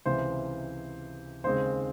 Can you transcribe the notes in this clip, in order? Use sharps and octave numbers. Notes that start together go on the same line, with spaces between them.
C#2 C3 E3 C5
D#2 C#3 G#3 C4 C5